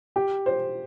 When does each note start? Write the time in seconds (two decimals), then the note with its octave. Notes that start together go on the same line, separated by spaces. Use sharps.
0.16 G4
0.46 C5